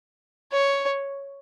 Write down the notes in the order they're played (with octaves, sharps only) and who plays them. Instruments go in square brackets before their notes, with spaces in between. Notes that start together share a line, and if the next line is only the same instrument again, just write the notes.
[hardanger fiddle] C#5